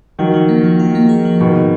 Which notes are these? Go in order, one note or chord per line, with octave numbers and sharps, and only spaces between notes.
D#3 F3 F#3
F3
A#3
F3
F4
A#3
G#4
F3
G#2 B2 D#3